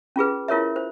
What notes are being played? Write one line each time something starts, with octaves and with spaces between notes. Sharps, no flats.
C#4 F4 G#4 B4
E4 F4 A#4 C#5 E5
C5